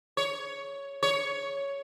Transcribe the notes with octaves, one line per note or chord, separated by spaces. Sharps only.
C#5
C#5